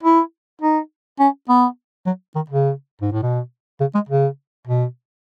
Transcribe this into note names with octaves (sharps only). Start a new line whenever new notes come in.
E4
D#4
C#4
B3
F#3
D#3
C#3
G#2
A2
B2
C#3
G#3
C#3
B2